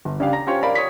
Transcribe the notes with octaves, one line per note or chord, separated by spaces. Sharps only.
G1
C#3 D4 G4 F5
A#5 A#6
C#4 F4 G4 C5 C#5
A#4 D5 F5 B5
C#5 D#6 B6